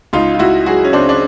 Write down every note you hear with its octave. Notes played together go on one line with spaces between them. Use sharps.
C#2 D#4 F4
F4
C#2 E4 F#4
F#3 F#4 G#4
C#4
C#3 C4 D4
D4